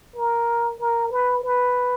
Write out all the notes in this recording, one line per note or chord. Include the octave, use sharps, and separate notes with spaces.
A#4
A#4
B4
B4